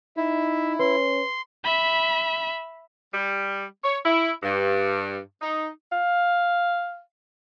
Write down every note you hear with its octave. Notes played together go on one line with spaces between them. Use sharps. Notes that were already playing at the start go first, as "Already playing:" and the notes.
D#4 E4 E5
C#4 B4 C6
E5 B5
G3
C#5
E4
G2
D#4
F5